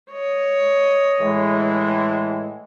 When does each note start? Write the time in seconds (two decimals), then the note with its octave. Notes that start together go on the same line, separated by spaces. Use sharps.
0.11 C#5 D#5
1.20 A2 E3 G#3